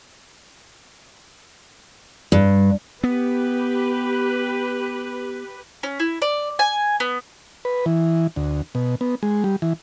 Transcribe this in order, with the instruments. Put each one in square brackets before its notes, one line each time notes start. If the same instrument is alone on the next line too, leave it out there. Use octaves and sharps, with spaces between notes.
[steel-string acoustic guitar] G2
[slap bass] B3 [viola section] G4 B4
[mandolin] C#4
E4
D5
G#5
B3
[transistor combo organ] B4
E3
D2
B2
B3
G#3
G3
E3